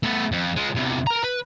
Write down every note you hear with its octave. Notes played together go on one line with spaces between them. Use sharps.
A3 B3
F2
G#3 F4
E2 C3
A#4 A#5
B4